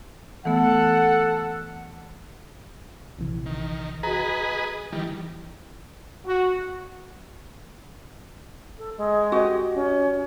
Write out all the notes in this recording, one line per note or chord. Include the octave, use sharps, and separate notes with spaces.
E3 A3 B3 A4 F#5
A#1 C3 E3
D#3
F#4 G#4 B4 D#5 A#5
D#3 E3 G3 E4
F#4
A4
G#3
F#4 G4 D#5
C#4